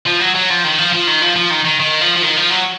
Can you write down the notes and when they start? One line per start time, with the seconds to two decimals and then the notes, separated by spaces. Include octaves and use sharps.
0.07 F3
0.21 F#3
0.35 F#3
0.50 F3
0.64 D#3
0.78 F3
0.93 F3
1.08 D#3
1.22 F3
1.36 F3
1.51 D#3
1.65 D#3
1.80 D#3
2.01 F3
2.16 F3
2.22 D#3
2.37 F3
2.51 F#3